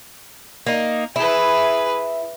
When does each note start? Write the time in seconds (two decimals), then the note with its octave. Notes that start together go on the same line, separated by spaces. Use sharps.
0.67 A#3 D#4
1.16 E4 G#4 B4